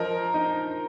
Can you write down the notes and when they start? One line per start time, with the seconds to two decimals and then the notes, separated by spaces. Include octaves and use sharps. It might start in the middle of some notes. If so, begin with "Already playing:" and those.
Already playing: F3 A#4 D#5
0.34 D#4